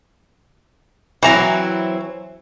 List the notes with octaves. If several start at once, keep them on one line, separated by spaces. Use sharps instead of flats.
E3 F#3 C4 E4 A#5